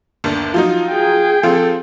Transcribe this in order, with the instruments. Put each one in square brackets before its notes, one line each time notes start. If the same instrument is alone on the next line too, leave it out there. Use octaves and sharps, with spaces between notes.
[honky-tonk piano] G1 D#2 D4
[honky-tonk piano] F3 F#3 D#4 [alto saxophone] F4
[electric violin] G#4 G5
[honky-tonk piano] F3 C4 F4 [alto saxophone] A4